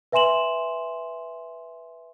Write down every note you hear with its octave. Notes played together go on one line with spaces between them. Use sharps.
B4 E5 G#5 C6 E7 F#7